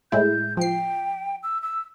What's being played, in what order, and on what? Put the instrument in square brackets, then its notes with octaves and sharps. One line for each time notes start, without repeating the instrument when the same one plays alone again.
[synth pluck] A2 G#3 E4 [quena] G6
[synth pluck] F3 C7 [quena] G5
[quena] E6
E6